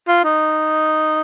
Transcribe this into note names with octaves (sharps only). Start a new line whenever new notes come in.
F4
D#4